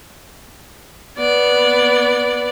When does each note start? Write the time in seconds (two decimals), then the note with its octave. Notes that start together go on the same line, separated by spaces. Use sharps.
1.18 B3 D5